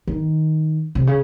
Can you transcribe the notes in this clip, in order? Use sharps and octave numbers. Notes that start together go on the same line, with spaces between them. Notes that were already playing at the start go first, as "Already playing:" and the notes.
D#3
C3
C#3